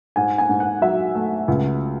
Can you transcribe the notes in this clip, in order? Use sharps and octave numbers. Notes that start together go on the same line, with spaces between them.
G#2 G#5
G#5
G#2
F#5
F#3 E5
A3
C#2